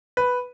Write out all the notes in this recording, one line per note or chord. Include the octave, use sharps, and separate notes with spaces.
B4